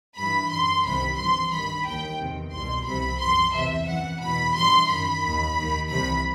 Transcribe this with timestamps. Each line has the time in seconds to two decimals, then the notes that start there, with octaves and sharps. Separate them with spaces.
0.17 G2 E3 B5
0.51 F#2 E3 C6
0.85 C2 C3 D#3 B5
1.18 G2 E3 C6
1.51 G2 D#3 B5
1.86 D#2 D#3 G5
2.19 E2 C3 D#3
2.53 C2 B2 C6
2.86 C2 C3 E3 B5
3.20 F#2 E3 C6
3.53 E2 C3 E3 E5
3.88 F#2 E3 F#5
4.21 E2 B2 B5
4.54 G2 E3 C6
4.88 F#2 D#3 B5
5.22 D#2 D#3
5.56 D#2 D#3
5.89 C2 C3 E3 B5